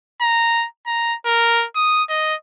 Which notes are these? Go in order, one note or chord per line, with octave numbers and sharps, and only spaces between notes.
A#5
A#5
A#4
D#6
D#5